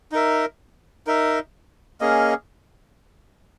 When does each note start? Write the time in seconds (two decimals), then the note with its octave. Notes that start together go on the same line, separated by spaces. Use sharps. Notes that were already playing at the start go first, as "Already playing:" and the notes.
0.12 D#4 A#4 E5
1.07 D#4 A#4 E5
2.01 A#3 C#4 G#4 D#5